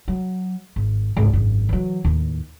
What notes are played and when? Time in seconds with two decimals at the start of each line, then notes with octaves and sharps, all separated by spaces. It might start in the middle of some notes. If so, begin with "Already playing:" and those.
0.08 F#3
0.76 G#1
1.17 G#1 C#2
1.33 G#1 F#2
1.69 E3 F#3
2.05 D#2 A2